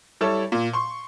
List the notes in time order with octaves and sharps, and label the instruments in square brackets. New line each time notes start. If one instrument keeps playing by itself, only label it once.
[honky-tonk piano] G3 E4 A4 C#5 A5
A#2
C6 C#6